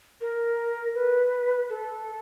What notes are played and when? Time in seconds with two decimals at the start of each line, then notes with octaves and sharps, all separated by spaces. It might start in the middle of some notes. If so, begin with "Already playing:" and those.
0.21 A#4
0.95 B4
1.70 A4